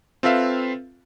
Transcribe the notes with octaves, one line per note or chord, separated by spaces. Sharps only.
C4 F4 A4 B4 E5 F5